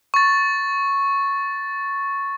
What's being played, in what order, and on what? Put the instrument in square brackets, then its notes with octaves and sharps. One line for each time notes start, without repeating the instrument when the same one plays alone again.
[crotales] C#6 A6